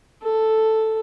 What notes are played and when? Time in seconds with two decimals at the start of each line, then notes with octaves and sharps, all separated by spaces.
0.23 A4